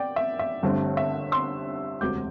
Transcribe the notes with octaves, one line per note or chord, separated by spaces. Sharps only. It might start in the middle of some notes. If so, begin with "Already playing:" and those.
Already playing: D5 G5
E5
E5
G1 G2 D3 A3 C4
E5
C6 E6
E1 D2 C3 D6 G6